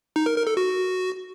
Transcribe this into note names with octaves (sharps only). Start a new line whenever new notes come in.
D#4
A#4
A#4
A4
F#4